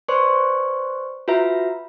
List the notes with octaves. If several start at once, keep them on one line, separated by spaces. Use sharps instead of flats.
B4 C5 D5 C6 C#6
F4 F#4 B4 E5 A#5